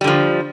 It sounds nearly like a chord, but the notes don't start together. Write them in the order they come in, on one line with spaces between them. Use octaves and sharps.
G3 D3 F3